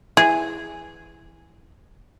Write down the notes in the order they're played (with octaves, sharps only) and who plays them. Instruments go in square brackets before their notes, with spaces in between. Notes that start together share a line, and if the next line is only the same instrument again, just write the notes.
[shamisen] E3 [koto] G#4